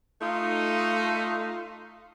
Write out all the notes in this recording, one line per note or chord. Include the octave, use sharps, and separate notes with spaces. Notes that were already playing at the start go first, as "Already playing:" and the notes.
A3 D#4 F4